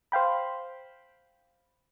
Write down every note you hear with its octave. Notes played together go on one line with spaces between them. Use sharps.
C5 F5 G5 B5